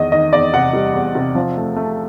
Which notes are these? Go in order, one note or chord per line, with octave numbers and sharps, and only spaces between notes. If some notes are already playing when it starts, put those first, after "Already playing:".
Already playing: E2 D#3 D#5
D#3 D#5
E2 D5
C3 F#5
G3
E2
C3
F3
A3
A3